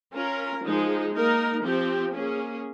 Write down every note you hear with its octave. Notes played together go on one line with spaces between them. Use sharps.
C#4 F4 A#4
F3 G#3 D#4
A#3 D#4 A#4
F3 C4 G4
A#3 C#4 G#4